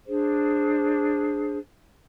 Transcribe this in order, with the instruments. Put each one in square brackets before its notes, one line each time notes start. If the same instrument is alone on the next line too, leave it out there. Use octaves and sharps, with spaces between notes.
[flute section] D4 G#4 C5